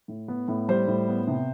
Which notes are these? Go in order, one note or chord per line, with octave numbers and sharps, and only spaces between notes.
A2
B3
A2
G3 C5
A2
B3
C3